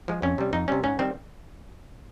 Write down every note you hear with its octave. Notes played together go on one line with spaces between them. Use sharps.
F3 G#3
F2 C#4
C3 G3
F2 D#4
C3 G3 C#4
G#2 C#4
D#3 G3 C4